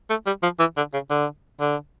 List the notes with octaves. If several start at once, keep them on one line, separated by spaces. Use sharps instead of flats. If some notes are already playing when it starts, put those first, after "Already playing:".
A3
G3
F3
E3
D3
C#3
D3
D3